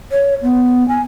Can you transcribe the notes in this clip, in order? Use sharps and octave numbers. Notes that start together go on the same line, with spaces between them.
C#5
B3
G#5